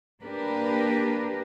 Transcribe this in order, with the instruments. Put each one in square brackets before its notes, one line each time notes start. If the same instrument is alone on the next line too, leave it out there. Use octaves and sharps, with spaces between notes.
[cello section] A#3 D4 G4 A#4 B4